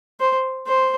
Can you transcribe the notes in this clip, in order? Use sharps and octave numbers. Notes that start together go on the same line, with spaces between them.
C5
C5